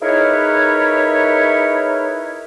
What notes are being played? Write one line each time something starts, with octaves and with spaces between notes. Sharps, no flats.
D#4 E4 G#4 A#4 B4 C#5